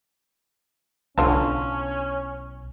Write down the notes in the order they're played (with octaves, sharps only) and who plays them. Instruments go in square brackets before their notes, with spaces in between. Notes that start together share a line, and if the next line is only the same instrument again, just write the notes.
[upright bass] B1 E4 [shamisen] D3 F4 A5 [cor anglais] C#4